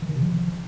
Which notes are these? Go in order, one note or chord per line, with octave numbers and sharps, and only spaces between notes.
E3
D#3
C3
F3